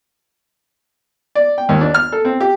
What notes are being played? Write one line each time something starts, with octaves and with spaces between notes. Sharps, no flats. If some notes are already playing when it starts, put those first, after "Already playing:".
D5
G5
D#2
D4
F6
A4
C4
G4